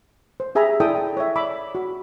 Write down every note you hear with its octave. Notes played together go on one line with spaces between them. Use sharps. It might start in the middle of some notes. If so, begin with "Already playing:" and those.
C5
G4 G#4 E5 G#5 A#5 B5
E4 A4 D5 G5 D#6
C#5 E5
D5 B5 D6 E6
F#4